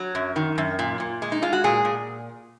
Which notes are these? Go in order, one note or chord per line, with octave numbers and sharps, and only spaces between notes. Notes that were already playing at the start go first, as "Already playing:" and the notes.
Already playing: F#3
F#2
D#3
F#2
A#2
A#2
G#3
D#4
G#3 F4
F#4
A#2 G#4
A#2